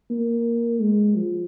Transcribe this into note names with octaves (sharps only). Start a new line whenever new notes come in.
A#3
G#3
F3